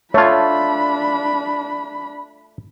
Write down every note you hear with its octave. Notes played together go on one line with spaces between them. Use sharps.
A3 D4 F4 C#5 A5 B5